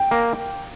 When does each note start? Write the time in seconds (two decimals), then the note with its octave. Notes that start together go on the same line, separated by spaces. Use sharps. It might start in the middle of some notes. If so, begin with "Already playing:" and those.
Already playing: G5
0.11 A#3